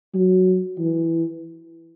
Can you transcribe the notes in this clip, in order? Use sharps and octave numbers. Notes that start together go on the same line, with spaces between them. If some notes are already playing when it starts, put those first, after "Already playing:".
F#3
E3